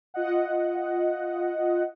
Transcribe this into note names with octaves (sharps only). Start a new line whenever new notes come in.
F4 D#5 F#5